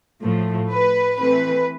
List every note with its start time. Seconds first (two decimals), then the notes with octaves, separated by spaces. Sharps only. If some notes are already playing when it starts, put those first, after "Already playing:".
0.23 A2 F3 A3
0.71 B4
1.19 E3 A3 C4 B4